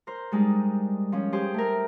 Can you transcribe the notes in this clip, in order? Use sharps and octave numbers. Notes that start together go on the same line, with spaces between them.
A#4 C5
G3 G#3 D4 D#4
F3 C#4
G4 G#4 C5
A3 A#4